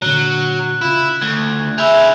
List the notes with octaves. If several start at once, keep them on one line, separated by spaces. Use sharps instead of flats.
A#2 D3 F#3 F#6
C#3 E4 F4
D2 G#6
G#3 E4 E5 E6 G6 G#6 F7